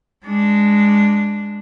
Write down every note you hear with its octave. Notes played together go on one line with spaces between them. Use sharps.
G#3 D4